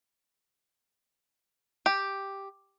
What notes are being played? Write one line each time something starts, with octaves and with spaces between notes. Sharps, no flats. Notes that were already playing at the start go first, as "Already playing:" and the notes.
G4